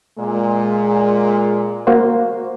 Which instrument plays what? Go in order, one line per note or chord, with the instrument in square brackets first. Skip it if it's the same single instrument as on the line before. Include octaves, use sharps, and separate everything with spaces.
[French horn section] A#2 G#3
[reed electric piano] A#3 F#4 C5